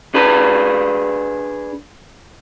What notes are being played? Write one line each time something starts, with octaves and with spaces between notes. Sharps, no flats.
D4 G#4 B4